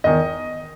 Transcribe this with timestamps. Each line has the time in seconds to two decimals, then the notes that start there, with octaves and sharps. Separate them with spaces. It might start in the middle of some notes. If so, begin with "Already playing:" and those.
0.04 E2 D#3 D#5